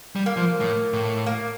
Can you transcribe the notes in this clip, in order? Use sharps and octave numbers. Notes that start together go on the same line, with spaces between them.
G3
A#3
F3
A2
A2
A#3